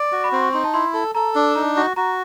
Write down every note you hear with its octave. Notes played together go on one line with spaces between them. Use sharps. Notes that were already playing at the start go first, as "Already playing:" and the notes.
Already playing: D5
F#4
B5
C4 C6
C#6
D#4 C6
A5
E4 C6
A4
A4 A#5
D4
D#4 A#5
F#4
F#4 A#5